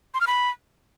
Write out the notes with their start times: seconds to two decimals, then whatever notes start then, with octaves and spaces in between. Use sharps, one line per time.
0.14 C6
0.21 F6
0.27 B5